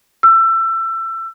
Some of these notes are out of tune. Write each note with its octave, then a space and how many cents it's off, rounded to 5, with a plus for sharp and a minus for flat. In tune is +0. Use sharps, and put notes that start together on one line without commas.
E6 +25